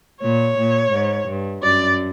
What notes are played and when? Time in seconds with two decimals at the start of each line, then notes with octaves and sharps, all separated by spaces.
0.22 A#2 C#5
0.58 A#2
0.92 G#2
1.28 G2
1.63 F#2 D5